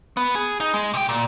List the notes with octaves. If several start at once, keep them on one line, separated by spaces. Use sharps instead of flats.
B3
G#4
D#4
G#3
C3 G5
A#2